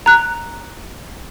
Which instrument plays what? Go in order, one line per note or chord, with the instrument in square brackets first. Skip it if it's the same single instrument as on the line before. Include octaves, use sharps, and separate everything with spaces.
[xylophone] A#5 F#6